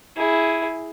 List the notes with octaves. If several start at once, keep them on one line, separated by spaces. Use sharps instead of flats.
E4 G#4